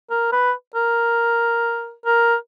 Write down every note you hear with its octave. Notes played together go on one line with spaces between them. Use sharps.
A#4
B4
A#4
A#4